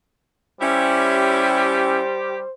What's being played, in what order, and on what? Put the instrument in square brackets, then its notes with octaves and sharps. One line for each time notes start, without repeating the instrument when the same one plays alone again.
[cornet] G3 [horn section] C#4 E4 [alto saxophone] G4 [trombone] C5